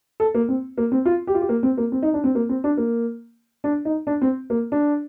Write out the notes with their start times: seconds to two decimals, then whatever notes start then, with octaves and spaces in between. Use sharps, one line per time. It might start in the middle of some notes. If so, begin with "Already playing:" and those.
0.20 A4
0.34 A#3
0.49 C4
0.78 A#3
0.92 C4
1.06 F4
1.27 G4
1.35 F4
1.41 G4
1.49 A#3
1.63 C4
1.77 A#3
1.92 C4
2.02 D#4
2.14 D4
2.24 C4
2.35 A#3
2.49 C4
2.64 D4
2.77 A#3
3.64 D4
3.85 D#4
4.07 D4
4.22 C4
4.50 A#3
4.72 D4